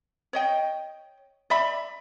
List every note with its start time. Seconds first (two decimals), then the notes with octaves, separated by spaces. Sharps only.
0.33 C#5 D#5 G5
1.50 D5 E5 B5